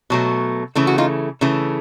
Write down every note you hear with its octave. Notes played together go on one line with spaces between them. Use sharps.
B2 F#3 A3
C#3 E3 A3
F#4
D#4 F4
C#3 E3 A3